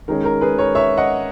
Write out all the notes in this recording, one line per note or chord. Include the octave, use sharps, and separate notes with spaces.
D#3 G#3 C#4 A#4
A#4
G#4 B4
A#4 C#5
C#5 E5
D#5 F#5